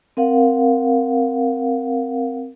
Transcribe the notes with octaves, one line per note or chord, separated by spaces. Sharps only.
C4 A#4 F5 F#5